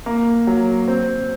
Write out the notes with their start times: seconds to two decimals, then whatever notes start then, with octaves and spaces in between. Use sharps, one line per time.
0.06 A#3
0.47 F#3
0.88 C4